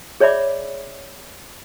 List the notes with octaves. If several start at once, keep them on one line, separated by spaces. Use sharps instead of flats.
G#4 C#5 D5 E5 B5 D6